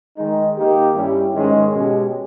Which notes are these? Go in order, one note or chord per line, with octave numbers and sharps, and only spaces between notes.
D#3 G#3 D#4
D#3 A#3 D#4 G4
G2 G3 C#4 E4 G4
G#2 D#3 G#3 C#4
B2 G#3 C#4 G4